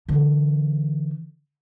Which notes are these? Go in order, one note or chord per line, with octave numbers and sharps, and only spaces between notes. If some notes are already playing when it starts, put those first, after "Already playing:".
D3 E3